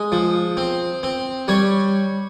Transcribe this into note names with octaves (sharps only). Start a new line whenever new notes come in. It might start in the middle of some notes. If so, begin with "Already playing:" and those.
Already playing: G#3 D#5
F3
C4
C4
G3 C#5